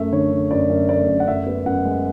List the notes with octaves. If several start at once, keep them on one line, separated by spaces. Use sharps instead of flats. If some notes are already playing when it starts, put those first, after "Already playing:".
Already playing: F#2 A3 E5
D3 C#5
D3
F#2 D5
F#2
A3 D5
F#2
F#5
F#2 E5
B3
F#2 F#5
G#3